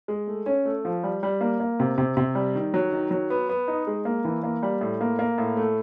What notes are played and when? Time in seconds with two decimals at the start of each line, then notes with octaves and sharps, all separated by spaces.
0.08 G#3
0.27 A3
0.46 C#4
0.65 A3
0.85 F3
1.04 G3
1.23 G3
1.41 A#3
1.60 A#3
1.80 C3
1.98 C3
2.17 C3
2.35 G3
2.55 D#3
2.74 F#3
2.92 D#3
3.11 F#3
3.30 B3
3.49 B3
3.68 D#4
3.87 G#3
4.05 A#3
4.25 E3
4.43 A#3
4.63 G3
4.81 A2
5.01 A#3
5.19 A#3
5.38 A2
5.57 A3